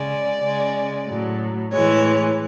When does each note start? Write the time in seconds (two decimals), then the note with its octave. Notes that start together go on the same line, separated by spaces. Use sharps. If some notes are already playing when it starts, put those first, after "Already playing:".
Already playing: C#3 G#3 D5
0.42 C#3 G#3
1.07 A2 F#3
1.72 A2 E3 G#3 C#5